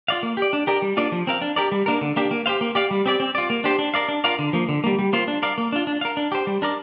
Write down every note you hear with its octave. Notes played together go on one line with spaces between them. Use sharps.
F4 D5 F5
A#3
G4 D5
D4
G4 A#4 D5
G3
A#3 D4 F4 D5
F3
C4 A#4 F5
D4
G4 A#4 D5
G3
A#3 D4 A#4
D3
A#3 D4 G4
A#3
G4 C5 F5
A#3
G4 D5 F5
G3
C4 G4 D5
C4
F4 D5
A#3
D4 G4 C5
D4
A#4 D5 F5
D4
F4 A#4 D5 F5
D3
F3 A#3
D3
G3 A#3
G3
A#3 F4 C5
D4
A#4 D5 F5
A#3
D4 F4
D4
A#4 F5
D4
G4 C5
G3
D4 A#4 D5